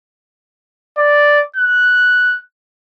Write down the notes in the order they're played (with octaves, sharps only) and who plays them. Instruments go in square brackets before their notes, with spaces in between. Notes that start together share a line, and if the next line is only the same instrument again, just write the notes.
[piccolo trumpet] D5
F#6